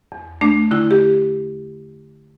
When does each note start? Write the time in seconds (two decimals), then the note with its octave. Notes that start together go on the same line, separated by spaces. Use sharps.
0.12 E2
0.41 A3 D4
0.71 D3 E4
0.91 G4